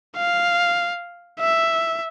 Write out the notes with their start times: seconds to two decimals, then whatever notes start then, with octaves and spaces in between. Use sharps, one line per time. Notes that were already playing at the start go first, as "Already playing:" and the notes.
0.17 F5
1.39 E5